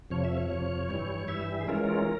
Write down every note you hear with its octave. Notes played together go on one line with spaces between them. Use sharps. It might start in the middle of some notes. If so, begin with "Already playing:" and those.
F2 C3 F3 C#5
E5
C#5
F2 C3 F3
G2 E3 G3
G2 E3 G3 E5
G#4
E3 G#3 C#4 F4 A#4